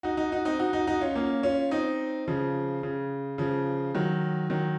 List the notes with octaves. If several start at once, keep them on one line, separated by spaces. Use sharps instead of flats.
D#4 F#4
D#4 F#4
D#4 F#4
C4 D#4
D#4 F#4
D#4 F#4
D#4 F#4
C#4 F4
A#3 C#4
C#4 F4
C4 D#4
C#3 F3
C#3
C#3 F3
D#3 F#3
D#3 F#3